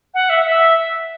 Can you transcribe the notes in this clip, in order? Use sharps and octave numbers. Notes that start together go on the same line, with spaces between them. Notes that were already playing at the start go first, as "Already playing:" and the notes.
F#5
E5
E5